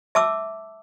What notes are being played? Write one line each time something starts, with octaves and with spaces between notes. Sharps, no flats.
E5 A5 D6 E6